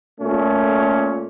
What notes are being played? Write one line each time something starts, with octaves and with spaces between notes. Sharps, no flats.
A#2 A3 C#4